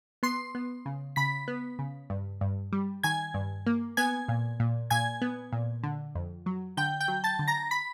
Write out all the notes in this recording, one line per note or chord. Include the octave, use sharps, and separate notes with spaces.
B3 C6 C7
B3
C#3
C#3 B5 B6
B3
C#3
G2
G2
G3
D#3 G#5 G#6
G2
A#3
B3 G#5 G#6
A#2
A#2
A#2 G#5 G#6
B3
A#2
D3
F2
F#3
D3 G5 G6
G5 G6
F#3
A5 A6
D3
A#5 A#6
B5 B6